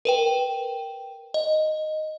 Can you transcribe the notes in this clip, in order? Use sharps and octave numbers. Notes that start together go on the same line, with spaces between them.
A#4 B4 G5
D#5